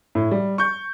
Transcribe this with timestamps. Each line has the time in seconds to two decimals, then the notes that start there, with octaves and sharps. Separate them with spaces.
0.15 A2
0.31 G3
0.58 C#6 G6